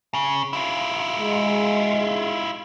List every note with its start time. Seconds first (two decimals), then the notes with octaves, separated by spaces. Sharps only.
0.14 C#3
0.53 E4 F4
1.20 G#3